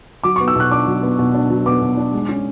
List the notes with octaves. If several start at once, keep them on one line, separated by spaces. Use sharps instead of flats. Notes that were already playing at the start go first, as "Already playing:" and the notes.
F#3 D6
B3 C#6
E6
B2 F#6
D4 D6
F#3
B3
B2
D4
F#3
B3 D6
B2
D4
G#3
C#4